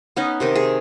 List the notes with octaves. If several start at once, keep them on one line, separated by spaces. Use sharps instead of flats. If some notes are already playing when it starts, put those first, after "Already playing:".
B3 C#4 D#4
C3 D#3 D#4
G#4